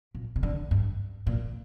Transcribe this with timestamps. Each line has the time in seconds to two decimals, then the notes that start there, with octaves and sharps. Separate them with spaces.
0.15 A#2
0.36 C3
0.43 D3
0.71 G2
1.27 A#2